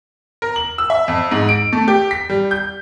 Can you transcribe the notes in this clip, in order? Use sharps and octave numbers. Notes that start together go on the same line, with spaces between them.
A#4
F#7
E6
E5
F2
G#2
D7
A3
G4
B6
G3
G6